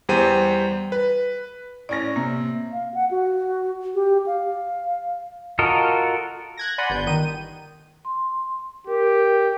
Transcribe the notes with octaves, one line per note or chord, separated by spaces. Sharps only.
E2 G3 C5 G5 D#7
B4
A2 C#4 D5 A#6
C3 A#3
F5
F#5
F#4
G4
F5
F4 F#4 A4 A#4 D#5
F#6 G#6 A#6
D5 F#5 G#5 B5 C6
G1 G6
D#3 D#7
C6
G4 A#4